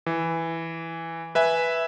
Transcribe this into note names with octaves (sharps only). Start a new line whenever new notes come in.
E3
B4 E5 G#5